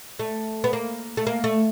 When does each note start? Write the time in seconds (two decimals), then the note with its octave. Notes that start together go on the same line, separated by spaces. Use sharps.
0.19 A3
0.64 B3
0.73 A#3
1.17 A3
1.27 A#3
1.44 A3